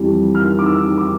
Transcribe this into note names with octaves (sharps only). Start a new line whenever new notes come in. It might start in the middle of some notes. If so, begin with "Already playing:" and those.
Already playing: F2 E3 G3
F6
D6
E6
D6